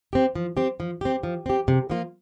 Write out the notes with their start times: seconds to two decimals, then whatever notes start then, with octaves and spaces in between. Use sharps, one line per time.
0.13 C4 G4
0.35 F3
0.57 C4 G4
0.80 F3
1.01 C4 G4
1.23 F3
1.46 C4 G4
1.68 C3
1.90 F3 A#3 F4